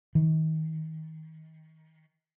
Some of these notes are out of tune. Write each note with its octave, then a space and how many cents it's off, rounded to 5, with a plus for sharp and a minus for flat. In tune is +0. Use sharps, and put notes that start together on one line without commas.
D#3 +30